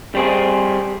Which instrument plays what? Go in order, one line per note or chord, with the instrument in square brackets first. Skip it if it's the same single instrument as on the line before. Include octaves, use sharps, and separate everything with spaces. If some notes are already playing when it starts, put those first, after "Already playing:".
[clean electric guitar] G3 C4 G#4